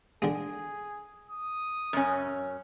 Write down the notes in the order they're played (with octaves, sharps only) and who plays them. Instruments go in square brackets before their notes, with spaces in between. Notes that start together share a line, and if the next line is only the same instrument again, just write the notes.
[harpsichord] D3 G#3 [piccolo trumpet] G#4
[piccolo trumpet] D#6
[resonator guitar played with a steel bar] F#2 C#4